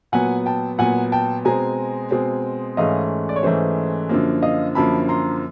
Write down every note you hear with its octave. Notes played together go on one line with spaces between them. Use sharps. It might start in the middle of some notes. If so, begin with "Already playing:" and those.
A#2 F#3 B3 F#5 G#5
G5 A5
A#2 F#3 B3 F#5 G#5
G5 A5
B2 G#3 C4 G#5 A#5
B2 G#3 C4
G#2 E3 A3 C#4 D#5 F5
D5
C#5
G#2 E3 A3 C#4 C5
F#2 D3 F3 A#3
D#5 F5
F#2 D3 F3 A#3 A5 B5
A#5 C6